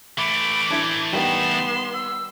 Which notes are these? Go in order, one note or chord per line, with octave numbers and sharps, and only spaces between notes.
E3 A3 B5 D6
D4 E4 E5 G#6
D#3 G3 B3 C6 E7
E6